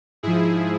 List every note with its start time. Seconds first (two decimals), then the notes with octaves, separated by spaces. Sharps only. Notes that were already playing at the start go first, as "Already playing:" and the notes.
0.23 G#2 F3 E4 G#4